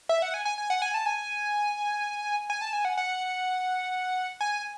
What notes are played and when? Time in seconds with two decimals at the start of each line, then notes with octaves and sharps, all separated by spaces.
0.09 E5
0.22 F#5
0.34 G#5
0.45 G#5
0.58 G#5
0.70 F#5
0.82 G#5
0.94 A5
1.06 G#5
2.50 G#5
2.61 A5
2.73 G#5
2.85 F#5
2.97 F#5
4.41 G#5